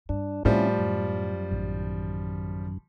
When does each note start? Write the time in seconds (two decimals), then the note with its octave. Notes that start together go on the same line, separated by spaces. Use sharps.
0.09 G2 D4
0.45 A2 F3 G3 C4 C#4 E4
0.78 F#2
1.51 A1 D#3